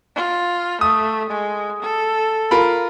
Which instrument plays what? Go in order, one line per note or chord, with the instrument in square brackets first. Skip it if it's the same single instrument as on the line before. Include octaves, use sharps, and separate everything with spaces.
[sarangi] F4
[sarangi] A3 [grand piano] D#6
[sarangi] G#3
A4
[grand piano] F4 A#4 B5